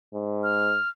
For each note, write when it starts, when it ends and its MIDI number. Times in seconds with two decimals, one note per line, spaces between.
0.14 0.77 44
0.43 0.89 89